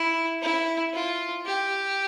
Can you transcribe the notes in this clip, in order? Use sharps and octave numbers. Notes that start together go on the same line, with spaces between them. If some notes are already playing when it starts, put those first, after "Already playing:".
Already playing: E4
E4
F4
G4